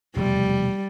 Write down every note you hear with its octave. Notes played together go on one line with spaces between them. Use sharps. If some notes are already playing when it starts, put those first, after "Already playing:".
F1 E2 B2 G3